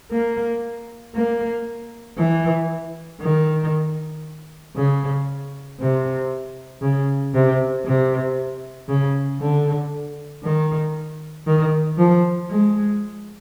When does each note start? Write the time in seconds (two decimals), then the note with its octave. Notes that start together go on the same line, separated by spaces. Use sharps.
0.11 A#3
1.15 A#3
2.18 E3
3.21 D#3
4.76 C#3
5.80 C3
6.82 C#3
7.34 C3
7.86 C3
8.89 C#3
9.40 D3
10.44 D#3
11.47 D#3
11.98 F3
12.50 G#3